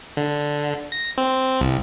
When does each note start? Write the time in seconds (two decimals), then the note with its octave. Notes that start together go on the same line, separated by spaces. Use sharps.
0.17 D3
0.92 A#6
1.18 C4
1.61 C2